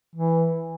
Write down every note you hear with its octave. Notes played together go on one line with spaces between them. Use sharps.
E3